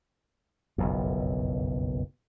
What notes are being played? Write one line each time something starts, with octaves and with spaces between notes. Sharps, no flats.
F#1 B1 F2